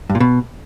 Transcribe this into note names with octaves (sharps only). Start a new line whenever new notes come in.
G2
A#2
B2